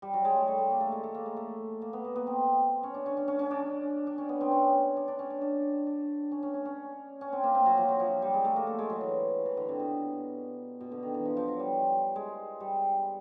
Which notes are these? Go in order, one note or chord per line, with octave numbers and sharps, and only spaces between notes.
G3
F#3
G#3
A3
G3
A3
A#3
A3
G#3
A3
A#3
G#3
A3
A#3
B3
A#3
B3
C4
C#4
D4
C#4
C#4
C#4
C#4
D4
D4
C#4
B3
C4
C#4
D4
D4
C#4
D4
D4
D4
C#4
C#4
C#4
C#4
C#4
C4
A#3
C4
F#3
F3
F#3
F3
G3
G#3
A3
A#3
A3
G#3
F#3
E3
E3
D3
C3
B2
B2
D3
D#3
E3
F3
F3
F#3
G3
G#3
G3